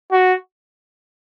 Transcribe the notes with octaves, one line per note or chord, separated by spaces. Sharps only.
F#4